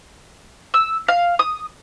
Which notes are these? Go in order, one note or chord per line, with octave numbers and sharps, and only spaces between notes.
E6
F5
D#6